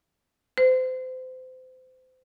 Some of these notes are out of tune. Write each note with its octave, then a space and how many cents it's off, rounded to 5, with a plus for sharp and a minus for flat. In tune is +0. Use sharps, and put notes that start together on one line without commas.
C5 -30